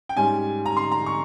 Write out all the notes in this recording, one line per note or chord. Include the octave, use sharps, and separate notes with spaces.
G5
G#2 G3 C#4 G#5
A#5
C6
A#5
C#6